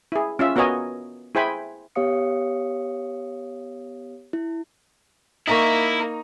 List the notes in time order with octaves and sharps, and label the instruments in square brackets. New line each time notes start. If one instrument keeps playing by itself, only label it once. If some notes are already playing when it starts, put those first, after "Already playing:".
[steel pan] E4 G#4
C#4 F4 E5
B3 F#4 A#4 C#5 D#5 G#5
E4 G#4 C5 G5 G#5 B5
[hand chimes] B3 G4 C#5 F5 D#6 C#7
E4
[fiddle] A#3 [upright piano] D#4 A#5 C#6 [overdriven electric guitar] E4 E5